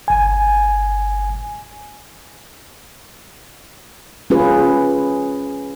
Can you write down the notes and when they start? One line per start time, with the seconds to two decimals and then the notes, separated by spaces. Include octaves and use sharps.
0.08 G1 G#5
4.30 C#4 F4 G#4 B4